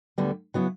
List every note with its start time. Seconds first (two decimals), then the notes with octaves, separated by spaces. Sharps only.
0.18 D2 D3 G3 B3
0.54 C#3 F#3 B3 E4